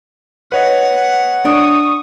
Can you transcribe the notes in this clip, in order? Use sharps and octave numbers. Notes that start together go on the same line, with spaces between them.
B4 C#5 D#5 F#5
D4 C#6 D#6